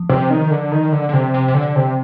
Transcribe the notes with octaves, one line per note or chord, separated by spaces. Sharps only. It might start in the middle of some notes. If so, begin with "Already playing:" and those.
Already playing: F3
C3
D#3
D3
D#3
D3
D3
C3
C3
C3
D3
C3